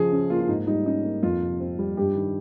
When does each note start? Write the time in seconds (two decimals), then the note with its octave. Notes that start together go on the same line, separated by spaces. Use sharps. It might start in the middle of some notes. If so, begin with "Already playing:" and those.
Already playing: C#3 F3 G#4
0.12 C#4
0.30 A#3 F4
0.40 F4
0.48 G#2 D#4
0.67 G3 D#4
0.86 C#4 D#4
1.04 A#3
1.23 F2 F4
1.42 C3
1.60 C4
1.78 G3
1.97 G2 G4
2.16 D#3